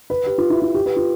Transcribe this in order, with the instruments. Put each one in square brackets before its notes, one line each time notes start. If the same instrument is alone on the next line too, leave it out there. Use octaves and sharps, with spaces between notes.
[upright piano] B4
G4
F4
E4
F4
G4
B4
F4